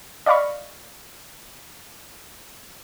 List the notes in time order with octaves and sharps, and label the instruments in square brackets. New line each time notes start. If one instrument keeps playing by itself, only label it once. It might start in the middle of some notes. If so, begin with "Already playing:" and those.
[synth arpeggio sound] D5 D#5 F5 B5 C#6